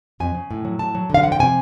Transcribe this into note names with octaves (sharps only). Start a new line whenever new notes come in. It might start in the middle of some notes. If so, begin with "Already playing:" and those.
F2 G#5
C#3
A2
F#3
A2 A5
F#3
D3 F5
F3 F#5
G5
C3 G#5